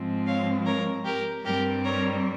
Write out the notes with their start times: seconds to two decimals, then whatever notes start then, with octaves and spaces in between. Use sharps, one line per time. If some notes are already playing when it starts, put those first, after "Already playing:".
Already playing: G#2 F3 G#3 C4
0.26 C#5 F5
0.65 A#4 C#5
1.05 G4 A#4
1.44 G2 G3 C4 G4 A#4
1.83 A#4 C#5